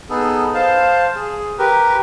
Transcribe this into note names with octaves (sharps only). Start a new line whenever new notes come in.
B3 D#4 G#4 A4
C5 F5 A5
G#4
G4 A#4 B4